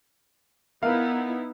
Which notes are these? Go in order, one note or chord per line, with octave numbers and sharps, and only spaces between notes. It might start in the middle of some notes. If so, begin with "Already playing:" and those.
B3 D#4 E4 A#4 F5